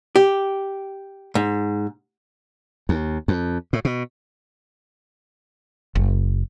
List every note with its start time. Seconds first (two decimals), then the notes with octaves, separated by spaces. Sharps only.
0.16 G4
1.35 G#2
2.89 D#2
3.28 F2
3.73 A2
3.85 B2
5.95 F#1